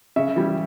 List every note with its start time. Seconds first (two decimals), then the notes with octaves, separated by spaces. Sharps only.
0.16 C#3 E5
0.36 E3 G3